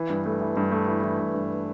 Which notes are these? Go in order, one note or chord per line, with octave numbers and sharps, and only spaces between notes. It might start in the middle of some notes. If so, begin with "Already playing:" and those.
Already playing: E3
G2
A3
E3
G2
A3
E3
E3
G2
G2